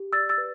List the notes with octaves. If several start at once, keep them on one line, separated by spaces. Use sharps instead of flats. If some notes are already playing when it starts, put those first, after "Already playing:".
Already playing: G4
D5 E6 A6
E6 A6
B4